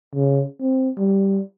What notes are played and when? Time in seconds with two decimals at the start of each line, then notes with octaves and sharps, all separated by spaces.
0.15 C#3
0.60 C4
0.98 G3